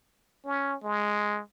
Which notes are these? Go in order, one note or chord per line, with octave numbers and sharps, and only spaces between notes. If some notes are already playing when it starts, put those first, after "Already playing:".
C#4
G#3